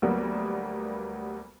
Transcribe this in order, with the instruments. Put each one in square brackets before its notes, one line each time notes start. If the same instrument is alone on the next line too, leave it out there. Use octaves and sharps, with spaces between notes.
[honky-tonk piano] D2 F#3 G3 A#3 B3